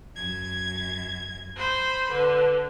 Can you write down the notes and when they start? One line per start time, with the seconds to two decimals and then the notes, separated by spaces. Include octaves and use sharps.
0.15 F#2 G#6
1.55 C5 B5 C6
2.09 D3 B4